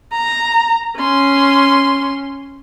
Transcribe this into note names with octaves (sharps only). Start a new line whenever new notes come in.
A#5
C#4 C6